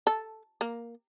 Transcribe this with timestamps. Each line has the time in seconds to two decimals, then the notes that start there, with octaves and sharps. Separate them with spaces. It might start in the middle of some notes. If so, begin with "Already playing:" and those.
0.07 A4
0.61 A#3